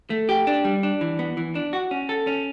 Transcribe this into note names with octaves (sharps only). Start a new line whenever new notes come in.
A3
G4
D4
G3
D4
E3
B3
E3
D4
F#4
C#4
A4
C#4